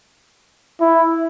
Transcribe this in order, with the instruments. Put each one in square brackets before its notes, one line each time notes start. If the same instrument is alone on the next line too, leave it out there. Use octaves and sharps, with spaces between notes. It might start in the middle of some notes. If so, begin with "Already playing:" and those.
[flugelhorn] E4